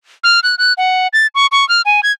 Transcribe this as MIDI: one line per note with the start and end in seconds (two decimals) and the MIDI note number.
0.24 0.40 89
0.43 0.55 90
0.58 0.73 90
0.78 1.07 78
1.13 1.27 93
1.35 1.47 85
1.52 1.67 85
1.69 1.82 89
1.85 2.01 80
2.03 2.12 92